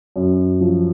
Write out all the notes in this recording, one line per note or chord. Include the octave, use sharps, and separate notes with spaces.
F#2
F3